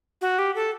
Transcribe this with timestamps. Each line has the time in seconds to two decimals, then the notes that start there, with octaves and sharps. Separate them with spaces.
0.21 F#4
0.39 G4
0.55 A4